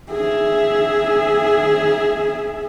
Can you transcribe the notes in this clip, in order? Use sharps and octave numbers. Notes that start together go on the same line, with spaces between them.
G#4 E5